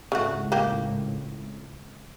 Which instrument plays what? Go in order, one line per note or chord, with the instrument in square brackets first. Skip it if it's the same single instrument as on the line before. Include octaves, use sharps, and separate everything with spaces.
[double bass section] G#1 C#2 A2 [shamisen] C#3 A3 F#4
[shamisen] A#3 G4